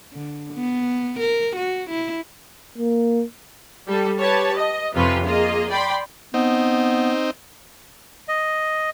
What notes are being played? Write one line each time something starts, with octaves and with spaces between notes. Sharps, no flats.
D3
B3
A#4
F#4
E4
A#3
G3 A4
G4 B4 C#5 A5
D#5
F2 C3 C#4 F4 B4
A#3 F4 G#4 D#5
D5 G5 B5 C6
B3 C4 D#4
D#5